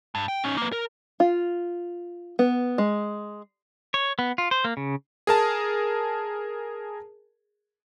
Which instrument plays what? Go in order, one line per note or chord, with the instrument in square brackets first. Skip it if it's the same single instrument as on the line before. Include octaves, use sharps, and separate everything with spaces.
[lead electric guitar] G2
G5
C#4 D#4
A#3 B4
A#4
[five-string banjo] F4
B3
G#3
[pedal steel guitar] C#5
B3
F4
C5
A#3
C#3
[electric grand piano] G#4 A#4 A5